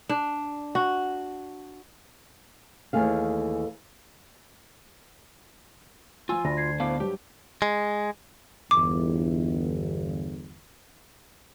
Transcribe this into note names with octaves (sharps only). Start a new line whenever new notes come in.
D4
F#4
D#2 E3 A3 G#4 F5
F3 F4 G#5 E6
D2 B5 A#6
G#6 C7
A2 B3 C5 F5 A5 D6
G2 F#3 G4
G#3
G1 E2 D6